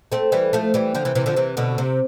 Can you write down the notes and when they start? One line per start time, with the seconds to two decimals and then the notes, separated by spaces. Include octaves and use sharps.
0.12 A3 C4
0.32 E3 G3
0.53 F3 A3
0.74 E3 G3
0.95 D3 F3
1.05 C3 E3
1.15 C3 E3
1.26 D3 F3
1.36 C3 E3
1.57 B2 D3
1.78 C3